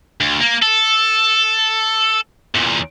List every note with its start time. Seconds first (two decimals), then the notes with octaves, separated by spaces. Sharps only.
0.21 D2
0.41 A#3
0.63 A4
2.55 E2 A#2